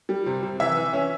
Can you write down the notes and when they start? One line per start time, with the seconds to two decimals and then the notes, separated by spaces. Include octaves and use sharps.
0.09 G3
0.26 C3
0.43 C3
0.60 E3 E5
0.77 E3
0.93 C#4